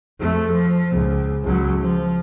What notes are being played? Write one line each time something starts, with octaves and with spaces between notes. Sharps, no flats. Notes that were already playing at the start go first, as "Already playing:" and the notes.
F2 A3
F3
C#2
C#2 F#3
F3